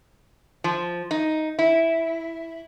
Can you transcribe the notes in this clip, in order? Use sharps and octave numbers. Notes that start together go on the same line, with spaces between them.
F3
D#4
E4